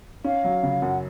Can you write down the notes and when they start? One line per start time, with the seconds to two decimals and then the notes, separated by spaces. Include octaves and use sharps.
0.24 C#4 F5
0.44 F#3
0.63 C#3
0.82 F#2 F#5